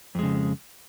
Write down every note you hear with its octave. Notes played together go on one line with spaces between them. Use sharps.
F2 C#3 G#3